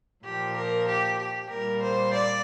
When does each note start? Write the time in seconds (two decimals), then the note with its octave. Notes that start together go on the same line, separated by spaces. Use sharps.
0.24 A#2 F3 A#3 G4
0.57 A#4
0.87 G4
1.19 G4
1.51 A#2 G3 A#3 A#4
1.82 C5
2.13 D5